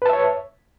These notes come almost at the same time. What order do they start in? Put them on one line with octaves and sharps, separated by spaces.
B4 A5 E5 C#5